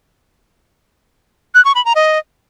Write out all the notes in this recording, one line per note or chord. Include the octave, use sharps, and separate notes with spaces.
F#6
C#6
B5
A#5
D#5